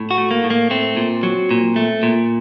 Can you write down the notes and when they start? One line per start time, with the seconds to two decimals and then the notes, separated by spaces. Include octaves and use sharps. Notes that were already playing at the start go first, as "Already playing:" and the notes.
Already playing: A2
0.11 F#4
0.18 A3
0.31 A#3
0.44 A2
0.50 A#3
0.70 A3 C4
0.97 A#2
1.23 F#3
1.51 A#2
1.76 A3
2.03 A#2